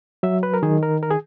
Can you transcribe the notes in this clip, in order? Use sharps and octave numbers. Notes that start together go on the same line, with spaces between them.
F#3 E5
B4
A#4
D#3 G#4
A#4
A#4
G#4